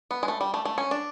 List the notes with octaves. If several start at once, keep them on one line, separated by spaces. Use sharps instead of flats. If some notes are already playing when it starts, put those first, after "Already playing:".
B3
G#3
A3
G3
A3
A3
C#4
D4